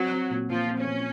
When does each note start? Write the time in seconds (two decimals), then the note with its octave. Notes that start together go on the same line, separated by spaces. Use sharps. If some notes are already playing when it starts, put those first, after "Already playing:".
Already playing: F#3 C4 F#4
0.12 C4
0.30 A#2
0.49 A#2 F3 F4
0.68 C4
0.77 C#4
0.86 A#2